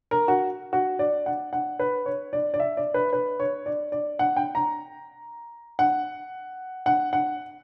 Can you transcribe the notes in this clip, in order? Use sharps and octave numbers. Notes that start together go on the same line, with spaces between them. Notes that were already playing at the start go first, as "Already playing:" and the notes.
A#4
F#4
F#4
D5
F#5
F#5
B4
C#5
D5
D5
E5
D5
B4
B4
C#5
D5
D5
F#5
G5
A#5
F#5
F#5
F#5